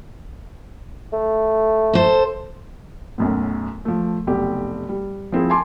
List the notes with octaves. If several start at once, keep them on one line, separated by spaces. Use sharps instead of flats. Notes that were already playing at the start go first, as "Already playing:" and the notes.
A3
A4 C5
B1 F#2 A2
F3 A3
F1 B1 G4
G3
F3 C4 E4 G#4
G#5 A5 C6 D6